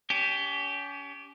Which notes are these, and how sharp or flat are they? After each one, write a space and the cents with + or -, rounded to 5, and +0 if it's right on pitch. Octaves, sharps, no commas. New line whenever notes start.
C#4 +35 G4 +0